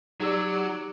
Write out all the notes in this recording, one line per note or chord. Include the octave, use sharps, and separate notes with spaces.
F#3 D#4 G4 D5 E6